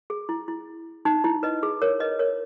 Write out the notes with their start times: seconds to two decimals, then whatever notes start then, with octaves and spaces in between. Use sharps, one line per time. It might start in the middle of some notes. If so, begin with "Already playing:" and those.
0.10 G#4
0.29 E4
0.48 E4
1.05 D#4
1.24 E4
1.43 B4 D#5
1.63 G#4
1.82 A#4 C#5
2.00 B4 D#5
2.19 A#4 C#5